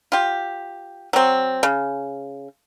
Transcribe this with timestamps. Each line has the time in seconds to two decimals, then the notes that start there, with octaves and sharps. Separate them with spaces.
0.12 F4 G4
1.13 F#3 C4
1.63 C#3